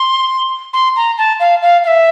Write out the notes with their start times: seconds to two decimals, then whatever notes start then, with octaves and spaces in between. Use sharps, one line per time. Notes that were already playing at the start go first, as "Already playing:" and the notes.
Already playing: C6
0.73 C6
0.96 A#5
1.18 A5
1.40 F5
1.62 F5
1.84 F5
1.87 E5